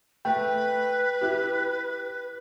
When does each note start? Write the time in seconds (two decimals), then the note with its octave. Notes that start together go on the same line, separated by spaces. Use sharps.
0.25 A3 B4 G5
1.21 E4 G4